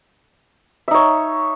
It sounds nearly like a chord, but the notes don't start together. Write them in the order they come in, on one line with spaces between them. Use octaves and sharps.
E5 D#4 C#5